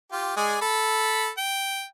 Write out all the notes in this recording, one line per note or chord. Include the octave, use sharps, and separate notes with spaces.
F4 G4
G#3 G#4 D5
A4 B5
G5